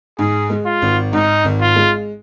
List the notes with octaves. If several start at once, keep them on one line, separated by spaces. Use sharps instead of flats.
G#2 G#4
G#3
F4
G#1
G#2 D#4
G#1
F4
G#3